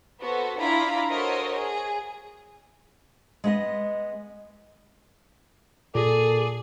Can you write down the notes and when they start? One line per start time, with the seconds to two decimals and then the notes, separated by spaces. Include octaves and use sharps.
0.21 B3 F#4 A4 C5
0.59 D4 E4 F4 F5 A#5 B5
1.10 F#4 A4 A#4 C5 C#5 D#5
1.57 G#4
3.44 G#3 B3 D#5
5.95 A#2 G#4 A4 D5